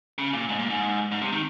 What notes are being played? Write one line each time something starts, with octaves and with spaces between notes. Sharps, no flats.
C#3
A#2
G#2
A#2
G#2
G#2
C3
D#3